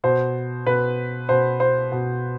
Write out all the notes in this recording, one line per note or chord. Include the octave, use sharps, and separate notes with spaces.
B2 C5
B2 B4
B2 C5
C5
B2